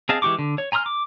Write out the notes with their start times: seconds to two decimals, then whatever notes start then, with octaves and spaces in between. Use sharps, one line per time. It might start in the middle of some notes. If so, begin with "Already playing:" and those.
0.09 C4 G#4 D#5 F5 A5
0.22 E3 G#3 G4 C#6 D6
0.39 D3
0.58 C#5
0.72 G#5 A#5 C6 D#6 F6
0.86 D6